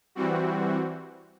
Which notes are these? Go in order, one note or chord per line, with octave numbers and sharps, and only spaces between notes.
E3 G3 C4 F#4